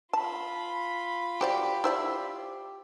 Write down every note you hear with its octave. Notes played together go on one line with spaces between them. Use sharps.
F4 A5 B5
F#4 G4 C5 D5
E4 C5 D5